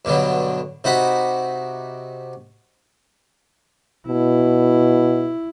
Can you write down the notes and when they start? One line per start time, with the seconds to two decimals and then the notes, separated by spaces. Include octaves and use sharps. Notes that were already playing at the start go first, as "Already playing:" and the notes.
0.05 G2 B2 D3 F#3
0.84 C3 D#4 F#4 F#5 B5
4.08 B2 E4